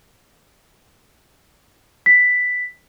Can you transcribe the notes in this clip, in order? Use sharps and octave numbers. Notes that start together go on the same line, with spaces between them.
B6